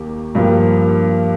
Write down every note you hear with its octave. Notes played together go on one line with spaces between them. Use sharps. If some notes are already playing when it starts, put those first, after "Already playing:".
Already playing: D#2 A#3 G4
G2 F3 A#3 G4